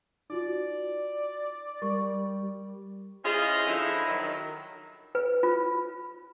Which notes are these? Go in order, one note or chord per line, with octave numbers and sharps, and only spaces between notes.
D#4 F4 F#4 D5
G3 A#4 C#6
C#4 E4 F4 G#4 C5 D#5
D3 F3 D#4 E4
D#3 F#3
B4
F4